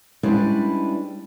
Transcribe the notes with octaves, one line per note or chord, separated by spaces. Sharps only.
G3 G#3 C#4 D4 E4 B4